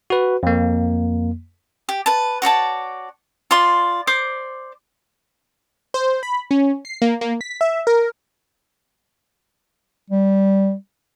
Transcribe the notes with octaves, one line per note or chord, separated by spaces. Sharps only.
F#4 B4
F2 A#3
G4
B4 A5
F#4 C#5 D5 A5
F4 D5 C6
C5 D5 D6
C5
B5
C#4
C7
A#3
A#3
B6
E5
A#4
G3